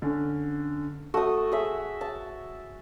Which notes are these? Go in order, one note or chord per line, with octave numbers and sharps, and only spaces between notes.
D3 C#4
A3 F#4 D#6
G#4 E5
A5